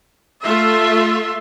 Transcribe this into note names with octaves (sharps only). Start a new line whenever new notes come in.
A3 F4 E5 C6